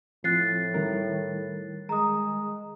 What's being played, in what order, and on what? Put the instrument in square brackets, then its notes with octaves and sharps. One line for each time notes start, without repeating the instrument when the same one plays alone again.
[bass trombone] A2 [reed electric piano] F3 C4 [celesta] F#6 A6 C7
[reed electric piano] D#3 G3 A#4
[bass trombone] G#3 [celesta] A#5 D#6